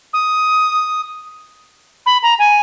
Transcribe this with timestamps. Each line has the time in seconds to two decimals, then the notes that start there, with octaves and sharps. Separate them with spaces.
0.13 D#6
2.06 B5
2.23 A#5
2.39 G#5